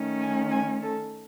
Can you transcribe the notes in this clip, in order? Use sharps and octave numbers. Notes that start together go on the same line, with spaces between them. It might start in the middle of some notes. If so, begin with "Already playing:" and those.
Already playing: D#3 A3 C#4
G#5
G#5
A4